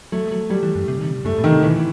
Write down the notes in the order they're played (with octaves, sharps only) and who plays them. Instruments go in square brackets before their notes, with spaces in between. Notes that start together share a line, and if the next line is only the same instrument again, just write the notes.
[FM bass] F#3 [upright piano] A3
[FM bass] F#3
[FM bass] F#3 [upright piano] G3
[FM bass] E3
F#2
C3
D#3
C3
[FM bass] F#2 [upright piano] A3
[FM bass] A2
[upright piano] D#3
[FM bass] C3
[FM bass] B2 [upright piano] E3